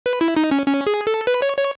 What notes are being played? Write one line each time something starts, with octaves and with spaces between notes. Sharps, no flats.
B4
E4
D#4
C#4
C#4
G#4
A4
B4
C#5
C#5